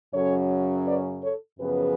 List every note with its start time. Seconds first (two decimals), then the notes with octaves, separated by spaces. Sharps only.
0.13 F#2 C#3 F#3 C#4 A4 C#5
0.86 B4 D5
1.23 A4 C#5
1.59 F#2 C#3 F3 B3 G#4 B4